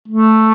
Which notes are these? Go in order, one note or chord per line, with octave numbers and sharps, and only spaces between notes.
A3